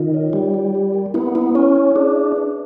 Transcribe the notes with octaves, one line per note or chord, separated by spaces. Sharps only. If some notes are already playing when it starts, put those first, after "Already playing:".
Already playing: D#3 F4
C#5
G3 E4
D5
G4
A#4
B3 E4
E4
C#4 C#5
E4
D4 G#4
E5
B4